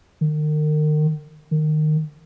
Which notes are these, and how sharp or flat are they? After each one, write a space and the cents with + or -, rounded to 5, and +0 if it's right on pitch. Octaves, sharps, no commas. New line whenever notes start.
D#3 -35
D#3 -20